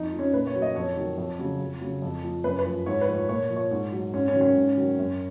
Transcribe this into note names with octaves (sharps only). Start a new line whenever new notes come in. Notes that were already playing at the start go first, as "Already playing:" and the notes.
Already playing: F2 D#4
F3
C#4
A#2 B4
C#5
F#3
D#5
F2 C#5
D#3 F#3
F2
C#3 F#3
F2
C#3 F#3
F2
F3
F#2 B4
B4
F3
G#2 C#5
B4
F3
C#5
A#2 C#5
F3
C#5
G#2
F#3
G#2 C#4
C#4
D#3 F#3
C#4
G#2
D#3 F#3
F#2